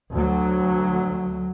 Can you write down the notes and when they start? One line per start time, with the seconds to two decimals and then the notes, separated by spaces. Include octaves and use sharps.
0.11 D2 F#3